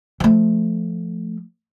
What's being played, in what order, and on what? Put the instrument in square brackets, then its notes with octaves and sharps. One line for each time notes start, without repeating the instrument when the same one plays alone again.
[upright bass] F3 A3